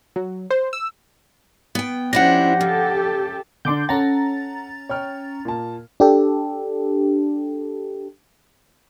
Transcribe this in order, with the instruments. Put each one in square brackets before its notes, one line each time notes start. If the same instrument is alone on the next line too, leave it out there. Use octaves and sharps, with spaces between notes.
[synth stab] F#3
C5
E6
[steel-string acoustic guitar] B3 G5
[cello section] F3 C#4 C5 [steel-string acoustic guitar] D4 E4 G4 [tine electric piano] F#5 A#6
[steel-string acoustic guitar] C#3 [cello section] G4 A4
[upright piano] D3 D4 [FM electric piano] C6 D6 G6
[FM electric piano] C#4 A#5 A6 [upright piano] A4 F#5
[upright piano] C#5 G5 F6
A#2 A#4 A5
[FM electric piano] D4 G4 A4